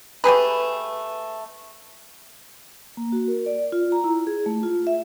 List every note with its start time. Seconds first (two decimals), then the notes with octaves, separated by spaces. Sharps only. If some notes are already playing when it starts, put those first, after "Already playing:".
0.24 A3 G4 G#4 B4
2.97 A#3
3.12 F#4
3.28 A#4
3.46 D5
3.72 F4
3.92 A#5
4.04 E4
4.27 G#4
4.46 A3
4.63 F4
4.87 E5